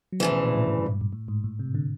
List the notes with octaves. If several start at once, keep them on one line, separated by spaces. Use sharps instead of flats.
F#3
D2 C#3 E3 F3
B2
A#2
A2
G#2
G2
G2
G2
A2
G#2
A2
C3
D3